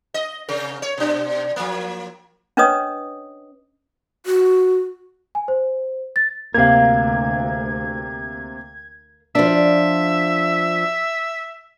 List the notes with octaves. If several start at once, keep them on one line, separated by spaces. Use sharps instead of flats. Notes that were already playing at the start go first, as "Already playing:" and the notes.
D#5
C3 A#4
C#5
B2 D4
F3 A#3
C#4 D4 B4 C#5 D#5 D#6
F#4
G#5
C5
A6
D2 C3 A#3 A#4 F5 G#6
F3 D4 E5